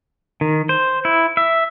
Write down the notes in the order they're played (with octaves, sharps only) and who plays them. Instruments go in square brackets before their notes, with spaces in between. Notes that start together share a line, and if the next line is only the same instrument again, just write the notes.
[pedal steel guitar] D#3
C5
E4
E5